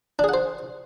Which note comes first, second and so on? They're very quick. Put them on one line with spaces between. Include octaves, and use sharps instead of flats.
D4 G#4 F#5 C5